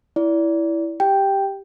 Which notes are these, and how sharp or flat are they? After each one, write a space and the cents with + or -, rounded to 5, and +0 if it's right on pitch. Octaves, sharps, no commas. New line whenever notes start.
E4 +0 D5 -30
G4 +0 G5 +0